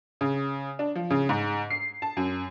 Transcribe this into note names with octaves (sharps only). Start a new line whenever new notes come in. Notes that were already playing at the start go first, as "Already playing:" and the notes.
C#3
D4
F3
C#3
G#2
C7
A5
F#2